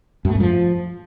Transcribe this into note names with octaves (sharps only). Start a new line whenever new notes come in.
F#2
A3
G#2
F3